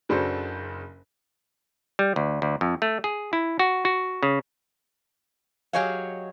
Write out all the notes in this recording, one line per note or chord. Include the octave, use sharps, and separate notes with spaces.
F#1 C#3 D4 F#4 A4 C5
G3
D2
D2
F2
A3
G#4
E4
F#4
F#4
C#3
F#3 G4 G#4 C#5 D#5 F5